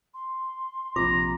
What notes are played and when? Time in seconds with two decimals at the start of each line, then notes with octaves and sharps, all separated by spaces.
0.14 C6
0.96 A#1 C3 F4 A#5 D6